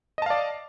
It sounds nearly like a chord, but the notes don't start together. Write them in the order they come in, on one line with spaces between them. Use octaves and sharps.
D#5 A5 F5 D5